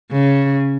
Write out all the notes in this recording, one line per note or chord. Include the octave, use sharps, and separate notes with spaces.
C#3